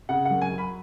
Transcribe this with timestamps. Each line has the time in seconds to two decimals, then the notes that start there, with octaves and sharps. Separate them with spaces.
0.09 C#3 F#5
0.25 F#5
0.31 F#2
0.42 G#5
0.52 F#3
0.58 B5